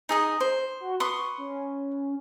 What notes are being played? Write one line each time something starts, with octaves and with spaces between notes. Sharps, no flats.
D#4 G#4 D#5
C5
F#4
B4 C6 C#6 D#6
C#4